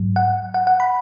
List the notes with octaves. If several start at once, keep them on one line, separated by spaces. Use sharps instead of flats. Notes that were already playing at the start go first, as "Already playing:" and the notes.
Already playing: G#2 F#3
F#5
F#5
F#5
B5